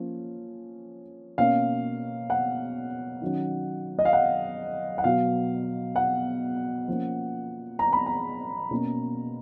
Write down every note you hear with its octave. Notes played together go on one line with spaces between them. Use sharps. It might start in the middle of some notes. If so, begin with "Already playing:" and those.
Already playing: F3 A#3 C#4
B2 A#3 C#4 F5
F#5
D#3 F#3 C#4
D#5
F5
F#5
F#5
B2 F#3 B3 F5
F#5
F3 A#3 C#4
A#5
B5
A#5
B2 A#3 C#4